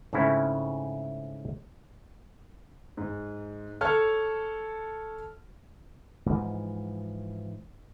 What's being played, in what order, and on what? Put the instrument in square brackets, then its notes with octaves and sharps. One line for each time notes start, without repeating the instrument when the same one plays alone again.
[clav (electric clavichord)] G#2 C#3 A3 C4 C#4 E4
[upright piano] G#2
A4 C#5 A5 F6
[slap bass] G#2 E3 F3